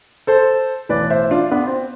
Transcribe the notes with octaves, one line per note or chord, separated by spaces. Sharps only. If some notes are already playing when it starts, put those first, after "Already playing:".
A4 C5
B1 A2 E3 B4 D5
C5 E5
D4 F4
B3 D4
C4